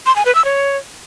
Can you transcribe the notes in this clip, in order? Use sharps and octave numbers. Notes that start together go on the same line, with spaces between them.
C6
G#5
B4
E6
C#5